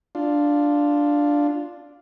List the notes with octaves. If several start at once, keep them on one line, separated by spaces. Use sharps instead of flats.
D4 F4